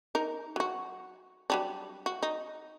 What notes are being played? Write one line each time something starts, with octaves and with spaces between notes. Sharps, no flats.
D#4 A#4
F#3 F#4
F#3 G3 D4
F#4
D#4